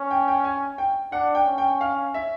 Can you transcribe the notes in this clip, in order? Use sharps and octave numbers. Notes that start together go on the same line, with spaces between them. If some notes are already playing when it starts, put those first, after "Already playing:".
Already playing: C#4
G5
G5
G#5
G5
D4 F#5
G5
C#4
G5
F5
E5